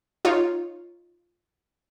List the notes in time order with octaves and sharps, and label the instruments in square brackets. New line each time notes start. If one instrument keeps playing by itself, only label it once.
[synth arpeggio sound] D#4 F4 C#5